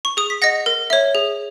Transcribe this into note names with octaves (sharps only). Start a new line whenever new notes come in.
C#6
G#4 D#6
B6
D#5 F#5 A#6
A#4
C#5 E5
G#4